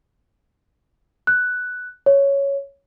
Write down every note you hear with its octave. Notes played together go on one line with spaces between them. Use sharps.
F#6
C#5